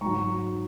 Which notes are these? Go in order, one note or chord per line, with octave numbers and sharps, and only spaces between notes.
G#2 F#3 A#5 C#6